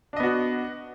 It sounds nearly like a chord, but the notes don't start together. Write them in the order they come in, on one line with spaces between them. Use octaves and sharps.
D4 D#5 B3 F#4